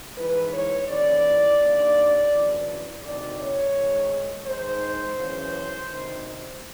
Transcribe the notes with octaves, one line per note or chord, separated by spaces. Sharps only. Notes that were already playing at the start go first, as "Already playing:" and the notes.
G#2 E3 B4
C#5
D#2 C#3 E3 D5
D#2 D3
D2 C#3 E3
D2 C3 D#3 D5
C#5
G#2 D#3
G#2 D#3 C5
F#2 C#3 E3
D2 C3 D#3